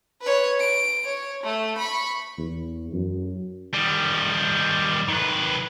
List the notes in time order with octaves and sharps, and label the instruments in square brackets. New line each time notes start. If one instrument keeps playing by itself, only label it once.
[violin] B4 C#5
D7
C#5
A3
B5 C#6
[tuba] E2
F#2
[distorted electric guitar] D#3 G3
D#3 B4